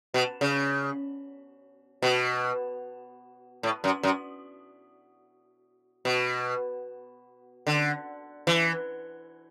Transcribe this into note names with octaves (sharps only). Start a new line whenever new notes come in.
B2
C#3
B2
A2
F#2
F#2
B2
D3
E3